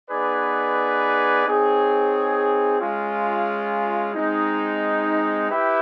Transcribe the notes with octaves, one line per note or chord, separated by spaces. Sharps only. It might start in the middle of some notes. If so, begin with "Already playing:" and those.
B3 D#4 G#4 B4 D5
C4 D#4 G#4 C#5
G#3 C#4 F4
G#3 C4 D#4
E4 G4 B4 E5 G5